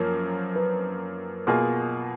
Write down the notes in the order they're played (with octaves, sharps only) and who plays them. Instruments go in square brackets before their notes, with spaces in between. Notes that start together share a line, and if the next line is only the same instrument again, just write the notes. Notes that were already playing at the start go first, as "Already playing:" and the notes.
Already playing: [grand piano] F#2 F3 A#3 [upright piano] A#4
[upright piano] B4
[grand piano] B2 A#3 F4 G#4